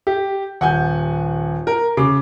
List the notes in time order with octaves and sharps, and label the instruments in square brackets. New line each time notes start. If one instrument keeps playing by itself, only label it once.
[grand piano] G4
[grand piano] D#1 [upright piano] F#5 G#5 G6
[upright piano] A#4
[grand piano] C#3 [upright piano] D6